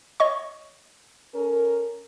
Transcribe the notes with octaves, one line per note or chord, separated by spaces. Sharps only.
C#5 D#5 C#6
C#4 A4 A#4